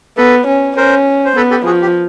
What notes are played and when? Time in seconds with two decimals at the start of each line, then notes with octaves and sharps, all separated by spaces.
0.17 B3 A4 B4
0.47 C#4
0.77 C#4 A#4 C5
1.25 C5
1.37 B3 A4 B4
1.51 G4 A4
1.66 F3 F#4 G#4
1.82 G4